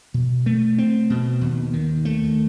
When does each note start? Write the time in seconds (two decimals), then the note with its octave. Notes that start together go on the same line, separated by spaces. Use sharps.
0.14 B2
0.46 A3
0.78 C4
1.10 B2
1.41 D#2
1.73 D#3
2.05 A3